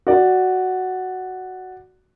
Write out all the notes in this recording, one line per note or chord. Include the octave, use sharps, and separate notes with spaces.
F#4 D5